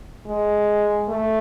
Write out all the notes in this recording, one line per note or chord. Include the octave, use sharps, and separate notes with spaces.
G#3
A3